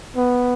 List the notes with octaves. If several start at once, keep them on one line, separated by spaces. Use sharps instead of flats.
B3